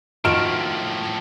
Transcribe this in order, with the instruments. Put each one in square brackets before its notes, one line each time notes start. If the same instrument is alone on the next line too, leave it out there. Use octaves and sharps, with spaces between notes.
[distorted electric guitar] A2 F3 [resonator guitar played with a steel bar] D#3 F4 F#4 [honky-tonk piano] F6 D7 E7